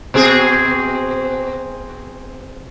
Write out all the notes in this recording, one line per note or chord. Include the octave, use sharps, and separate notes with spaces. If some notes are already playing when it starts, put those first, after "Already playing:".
B2 C4 G#4